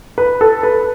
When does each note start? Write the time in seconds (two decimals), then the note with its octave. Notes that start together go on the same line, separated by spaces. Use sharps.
0.18 B4
0.41 A4
0.63 B4